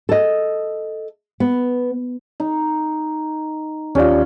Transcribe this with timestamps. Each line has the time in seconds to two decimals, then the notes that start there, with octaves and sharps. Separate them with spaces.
0.09 A4 D#5
1.40 B3
2.40 D#4
3.95 D#2 C#4 F4 G4 D5